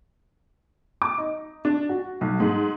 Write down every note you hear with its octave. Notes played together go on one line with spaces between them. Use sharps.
D6
D#4
D4
F#4
B1
G#2